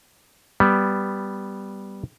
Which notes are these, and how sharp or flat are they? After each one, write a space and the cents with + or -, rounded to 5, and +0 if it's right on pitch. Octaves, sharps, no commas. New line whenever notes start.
G3 +0 B3 +0